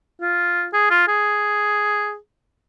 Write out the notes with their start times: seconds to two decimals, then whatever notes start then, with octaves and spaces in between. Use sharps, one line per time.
0.21 F4
0.73 G#4
0.91 F4
1.08 G#4